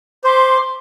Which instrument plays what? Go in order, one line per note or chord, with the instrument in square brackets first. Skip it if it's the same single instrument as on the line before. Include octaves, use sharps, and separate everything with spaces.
[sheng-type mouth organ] C5 [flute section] B5 C6 D6